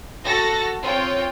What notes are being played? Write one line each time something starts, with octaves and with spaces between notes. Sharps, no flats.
F#4 A4 A6 A#6 C#7
C4 F4 C#5 G5